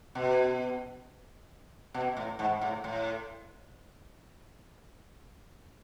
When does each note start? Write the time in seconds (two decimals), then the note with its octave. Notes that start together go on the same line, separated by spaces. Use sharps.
0.15 B2
1.94 B2
2.17 A2
2.39 G#2
2.61 A2
2.84 A2